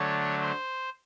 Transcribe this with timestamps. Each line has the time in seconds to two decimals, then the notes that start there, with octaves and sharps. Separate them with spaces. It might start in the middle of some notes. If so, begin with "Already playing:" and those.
Already playing: D3 F#3 A3 D4 C#5
0.41 C5